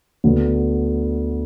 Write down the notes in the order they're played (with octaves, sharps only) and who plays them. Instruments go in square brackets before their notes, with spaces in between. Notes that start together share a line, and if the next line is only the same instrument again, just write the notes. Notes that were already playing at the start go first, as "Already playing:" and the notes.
[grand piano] D2 D3 B3